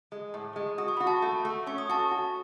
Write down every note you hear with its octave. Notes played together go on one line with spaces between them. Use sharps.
G#3
A2
G#3
F#4 D#6
C#6
F#4 B5
A5 C#6
A3
A3
C#4 C#6
D#6
F#4 A5 C#6
F#4